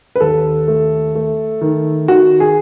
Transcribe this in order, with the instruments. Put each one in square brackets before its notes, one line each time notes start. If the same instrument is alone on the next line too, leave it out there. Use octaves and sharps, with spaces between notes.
[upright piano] B4
D#2 A4
A3
A3
D#3
D#3 F#4
G#4